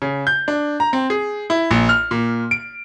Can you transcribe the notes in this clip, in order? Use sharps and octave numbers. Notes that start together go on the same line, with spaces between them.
C#3
G6
D4
A#5
C4
G#4
E4
A#1
F6
A#2
D7